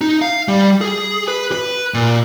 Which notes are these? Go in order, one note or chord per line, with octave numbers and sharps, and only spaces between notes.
D#4
F5
G3
G#4
B4
B4
A#2